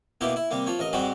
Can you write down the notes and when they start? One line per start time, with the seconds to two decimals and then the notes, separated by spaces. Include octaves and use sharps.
0.21 B2 A#3 E4 G4 G5
0.36 E4
0.51 C3 G3 A#3
0.66 F3 C#5
0.79 A1 A#4 D#5
0.93 G#2 G3 G#3 C4 F#4 G4